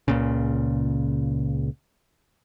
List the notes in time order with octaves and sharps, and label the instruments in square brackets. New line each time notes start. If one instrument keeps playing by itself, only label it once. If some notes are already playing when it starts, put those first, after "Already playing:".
[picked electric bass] C#2 A#2 C#3